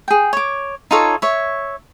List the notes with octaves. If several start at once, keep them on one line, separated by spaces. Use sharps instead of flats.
G#4 G5
C#5 D6
D#4 F4 A4 C#5
C#5 E5